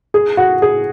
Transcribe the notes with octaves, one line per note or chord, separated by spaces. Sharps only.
G#4
F#4
G#4